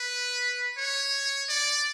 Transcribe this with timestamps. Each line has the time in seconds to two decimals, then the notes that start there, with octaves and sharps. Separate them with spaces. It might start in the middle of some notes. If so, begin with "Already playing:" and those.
Already playing: B4
0.77 C#5
1.49 D5